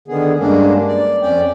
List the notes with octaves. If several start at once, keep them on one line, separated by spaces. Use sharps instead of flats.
D3 D#3 B3 G#4
G2 G#3 A#3 C#4 D4
D5
F2 C#4 D5 G5